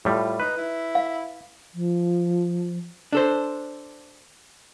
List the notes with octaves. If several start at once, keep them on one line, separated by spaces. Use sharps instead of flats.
A2 G3 F4
D#4 B4
E4
F5
F3
D4 A4 C5